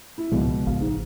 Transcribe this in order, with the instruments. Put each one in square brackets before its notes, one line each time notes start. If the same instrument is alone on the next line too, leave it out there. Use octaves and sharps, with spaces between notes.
[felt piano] E4
[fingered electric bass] C#2 F3 G#3 [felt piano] B2
[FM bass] A1 [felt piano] F5
[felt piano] G#2